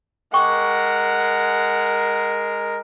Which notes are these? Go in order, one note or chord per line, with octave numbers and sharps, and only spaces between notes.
G#3 A#4 F#5 G5 C#6 D6